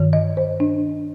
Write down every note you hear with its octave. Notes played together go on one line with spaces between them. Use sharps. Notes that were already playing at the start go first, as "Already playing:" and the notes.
Already playing: G2 D#3
D#5
C5
D4